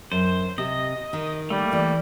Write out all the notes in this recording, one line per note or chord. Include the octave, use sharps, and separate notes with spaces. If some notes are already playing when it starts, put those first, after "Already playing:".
F#2 C5
C3 D#5
D#3
G3 A3 A#3
E3 D5